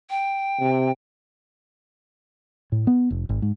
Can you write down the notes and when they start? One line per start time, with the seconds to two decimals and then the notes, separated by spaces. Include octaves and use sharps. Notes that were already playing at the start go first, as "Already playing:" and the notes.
0.10 G5
0.60 C3
2.72 A2
2.87 B3
3.11 F1
3.29 G#1
3.42 G#2